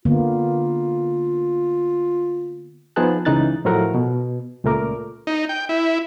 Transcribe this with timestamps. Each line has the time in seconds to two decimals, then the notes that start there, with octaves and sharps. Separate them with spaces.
0.05 D3 A#3 B3 F4
2.96 F3 B3 D#4 G#4 A5 F#6
3.25 C#2 C#3 E3 D#4 F#6 A6
3.65 A2 F3 F#3 A3 A#4 F#5
3.95 B2
4.64 C#2 A#2 A3 A#4 D6
5.27 D#4
5.49 G5
5.69 E4